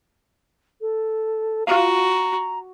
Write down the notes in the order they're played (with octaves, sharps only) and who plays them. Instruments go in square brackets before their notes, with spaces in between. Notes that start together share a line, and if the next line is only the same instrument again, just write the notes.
[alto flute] A4
[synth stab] F4 F5 [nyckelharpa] F#4 [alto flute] A#5